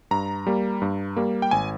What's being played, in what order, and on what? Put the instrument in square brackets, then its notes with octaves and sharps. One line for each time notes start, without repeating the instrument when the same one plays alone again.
[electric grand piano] G2 A#5
G3 A#3
G2
G3 A#3
G5
G#1 G#5